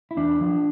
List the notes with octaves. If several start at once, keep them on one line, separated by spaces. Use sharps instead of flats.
E4
E2 D4
F3